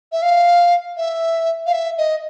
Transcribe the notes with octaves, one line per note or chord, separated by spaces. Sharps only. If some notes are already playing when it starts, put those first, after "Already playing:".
E5
F5
E5
F5
E5
D#5